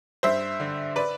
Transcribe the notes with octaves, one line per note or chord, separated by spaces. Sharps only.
G2 C5 E5
D3
B4 D5